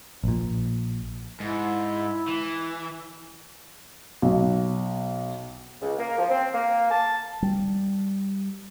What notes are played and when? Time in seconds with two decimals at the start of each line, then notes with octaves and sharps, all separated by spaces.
0.24 A#1 A#2
1.40 G#2 E4
2.28 E3
4.22 B1
5.81 C#2
5.98 A#3
6.18 F3
6.30 C4
6.52 A#3
6.90 A5
7.42 G3